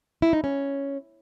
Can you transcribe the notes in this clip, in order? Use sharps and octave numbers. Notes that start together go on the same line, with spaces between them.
E4
D#4
C#4